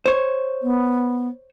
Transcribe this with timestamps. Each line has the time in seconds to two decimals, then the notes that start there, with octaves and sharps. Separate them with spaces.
0.06 C5 C#5
0.62 B3